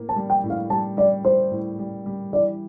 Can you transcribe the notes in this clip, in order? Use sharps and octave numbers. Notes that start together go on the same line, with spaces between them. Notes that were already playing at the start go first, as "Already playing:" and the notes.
Already playing: A2 A#3
A5
G3
G5
A2
F5
G3 A5
G3 D5
G3 C5
A2
G3
G3
E3 D5